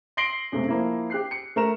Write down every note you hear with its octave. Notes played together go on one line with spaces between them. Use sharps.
C6 A#6 C7 D7 F#7 G7
B1 F#2 C3 G#3 A3
F3 A#3 E4
G4 F#6 C7
C#7
A3 A#4 E7